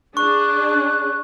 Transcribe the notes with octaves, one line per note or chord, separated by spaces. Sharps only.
D4 G#4 C#6 F#6